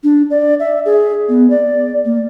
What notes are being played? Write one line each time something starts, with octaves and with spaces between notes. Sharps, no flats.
D4
D5
E5
G#4
B3
D5
A#3